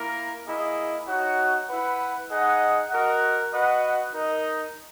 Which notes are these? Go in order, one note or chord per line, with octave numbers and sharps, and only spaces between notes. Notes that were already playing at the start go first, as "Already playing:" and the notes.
Already playing: A#3 E4 A#4
A#3 E4 G#4 D#5
D#4 F#4 C#5 F#5
E4 B4 F#5
D#4 G#4 D#5 F#5
F#4 A#4 D#5 F#5
F#4 B4 D#5 F#5
D#4 A#4 D#5